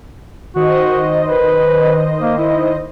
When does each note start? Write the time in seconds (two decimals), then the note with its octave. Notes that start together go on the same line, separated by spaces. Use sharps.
0.56 D#3 F#4 C5 D#5
1.26 B4
2.22 A#3
2.38 E4